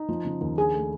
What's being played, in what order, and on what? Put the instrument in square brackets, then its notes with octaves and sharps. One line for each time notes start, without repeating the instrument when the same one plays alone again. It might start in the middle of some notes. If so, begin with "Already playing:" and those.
Already playing: [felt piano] D#4
F3
C#3
D#2
[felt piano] D4 [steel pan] G#4
[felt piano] A3